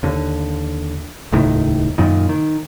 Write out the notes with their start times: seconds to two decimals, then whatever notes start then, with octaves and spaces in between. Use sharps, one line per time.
0.03 D#2 D3
1.32 D#1 C#2 A2 D#3
1.98 F#2 A#2 D#3
2.29 D#3